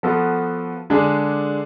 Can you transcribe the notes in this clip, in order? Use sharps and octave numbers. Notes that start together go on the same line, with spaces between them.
F3 B3 F#4 A4
D3 G#3 D4 G#4